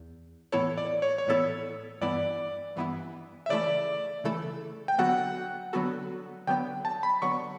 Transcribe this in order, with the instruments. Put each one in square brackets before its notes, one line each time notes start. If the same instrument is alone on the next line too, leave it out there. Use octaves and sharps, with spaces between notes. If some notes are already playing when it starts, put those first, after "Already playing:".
Already playing: [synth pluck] E2
[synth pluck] A2 E3 B3 E4 A4 [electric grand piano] C#5
[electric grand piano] D5
C#5
C#5
[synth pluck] A2 E3 B3 E4 A4
[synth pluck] G2 E3 B3 E4 [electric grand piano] D5
[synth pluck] G2 E3 B3 E4
[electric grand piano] E5
[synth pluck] C#3 E3 A3 E4 A4 [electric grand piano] D5
[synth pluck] C#3 E3 A3 E4 A4
[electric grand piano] G5
[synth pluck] D3 F#3 B3 F#4 A4 [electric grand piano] F#5
[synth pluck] D3 F#3 B3 F#4 A4
[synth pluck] D3 F#3 B3 [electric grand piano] G5
[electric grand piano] A5
B5
[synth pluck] D3 F#3 B3 [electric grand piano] C#6